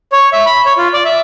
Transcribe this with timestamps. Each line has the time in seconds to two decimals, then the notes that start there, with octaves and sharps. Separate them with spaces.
0.12 C#5
0.33 E5
0.46 B5
0.65 C#5
0.77 F4
0.93 D5
1.05 E5